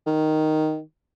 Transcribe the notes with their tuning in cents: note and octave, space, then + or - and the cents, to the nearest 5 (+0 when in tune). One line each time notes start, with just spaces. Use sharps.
D#3 +0